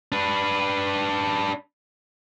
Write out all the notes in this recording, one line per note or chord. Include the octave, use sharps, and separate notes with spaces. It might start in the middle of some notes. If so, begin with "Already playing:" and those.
D4 B4